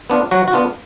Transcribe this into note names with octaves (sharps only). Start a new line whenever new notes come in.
B3 D4 F4
F#3 F#4
F#4
B3 D4 F4